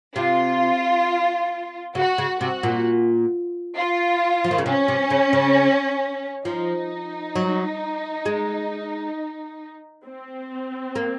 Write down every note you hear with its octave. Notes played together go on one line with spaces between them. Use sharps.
C3 F4
C#3 F#4
C#3
C3 F#4
A#2
F4
F3
D#3
C#3
C3 C#4
C3
C#3
C#3
F3 D#4
F#3
G#3
C4
A#3